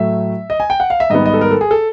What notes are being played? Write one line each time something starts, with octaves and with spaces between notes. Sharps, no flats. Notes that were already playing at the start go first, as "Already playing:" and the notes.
Already playing: A2 F#3 A3 E5
D#5
G#5
G5
F#5
F5
E5
G#2 D#3 G3 B3 D#5
D#5
A4
A#4
A4
G#4
A4